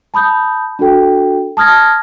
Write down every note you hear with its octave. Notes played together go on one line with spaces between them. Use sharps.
A5 B5 D#6 G6
D4 F#4 A4 G5
A5 D#6 F6 G#6 A#6